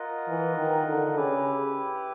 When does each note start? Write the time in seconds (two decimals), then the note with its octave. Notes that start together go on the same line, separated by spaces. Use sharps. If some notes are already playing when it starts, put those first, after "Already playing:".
Already playing: F4 A#4 D#5 F#5
0.28 E3
0.57 D#3
0.87 D3
1.16 C#3 E4 G4 B4